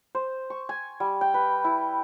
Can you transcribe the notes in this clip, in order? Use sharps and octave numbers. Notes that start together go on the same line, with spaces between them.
C5
C#6
G#5
G3
G5
B4
E4